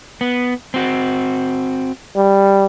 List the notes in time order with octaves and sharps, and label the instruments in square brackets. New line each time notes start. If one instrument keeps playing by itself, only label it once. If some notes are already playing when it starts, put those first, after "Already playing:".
[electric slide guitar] B3
C4 F#4
[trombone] G3